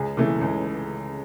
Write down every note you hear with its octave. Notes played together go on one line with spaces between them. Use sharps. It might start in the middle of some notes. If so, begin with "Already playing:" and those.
Already playing: C#2 G#4
C#3 E3 A3
C#2